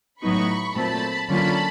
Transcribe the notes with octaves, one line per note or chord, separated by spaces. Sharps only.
A2 F#3 B3 D#4 B5 C#6
A#2 F#3 A3 C4 A5 B5
D3 F#3 A#3 C#4 F4 A5 B5